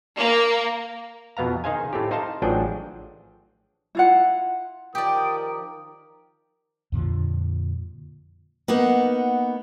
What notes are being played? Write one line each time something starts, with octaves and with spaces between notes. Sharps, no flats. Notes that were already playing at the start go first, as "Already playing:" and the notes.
A#3
F2 B2 B3 F5 A#5
D#3 D#4 G#4 C5 F5 G#5
A2 A3 C4 G4
D#4 C5 F5 A5 A#5
A1 F3 F#3 D4 G#4 G5
E4 F4 F#5
D#3 F3 G4 A#4 D5 G5 D#6
F2 A#2 D3 F3
A#3 B3 D#4 F#5